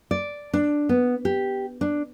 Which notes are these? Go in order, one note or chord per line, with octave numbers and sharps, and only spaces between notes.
D5
D4
B3
G4
D4